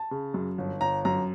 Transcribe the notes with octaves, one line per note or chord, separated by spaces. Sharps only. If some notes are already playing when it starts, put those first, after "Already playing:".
Already playing: A5
C#3
F#2
G1
G1 A#5
F#2 A#5